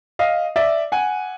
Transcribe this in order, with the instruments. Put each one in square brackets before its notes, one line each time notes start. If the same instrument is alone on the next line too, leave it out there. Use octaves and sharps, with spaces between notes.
[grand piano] D#5 F5
D5 E5
F#5 G#5